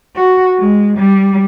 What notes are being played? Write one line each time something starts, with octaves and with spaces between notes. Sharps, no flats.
F#4
G#3
G3